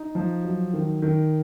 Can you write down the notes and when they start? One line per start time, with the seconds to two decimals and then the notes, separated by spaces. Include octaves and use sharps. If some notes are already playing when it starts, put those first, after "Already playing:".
Already playing: D#4
0.15 F3
0.44 F#3
0.73 D#3
1.02 D#3